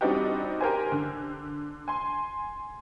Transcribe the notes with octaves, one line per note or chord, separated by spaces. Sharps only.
G3 C4 D4 D#4 F#4 G4
G4 A#4 C5 G#5
D3
G#5 C6